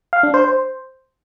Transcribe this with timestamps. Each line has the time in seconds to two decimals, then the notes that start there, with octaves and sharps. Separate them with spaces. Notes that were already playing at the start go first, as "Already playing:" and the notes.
0.13 F5
0.23 D4
0.34 C5
0.44 C5